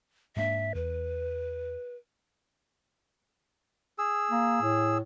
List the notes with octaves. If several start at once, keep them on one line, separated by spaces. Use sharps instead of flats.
G#2 A#3 D4 E5
E2 B4
G#4 E6
A#3
A2